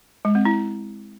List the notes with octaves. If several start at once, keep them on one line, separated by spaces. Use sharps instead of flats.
G#3
C4
E4